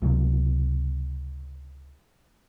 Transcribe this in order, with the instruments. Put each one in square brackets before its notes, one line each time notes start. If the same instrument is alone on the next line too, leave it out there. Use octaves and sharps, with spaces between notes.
[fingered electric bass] C#2 C3 F#3